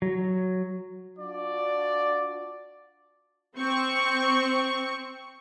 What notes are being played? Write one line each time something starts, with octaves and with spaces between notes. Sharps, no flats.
F#3
D4 F4 F#4 D5
C4 C#6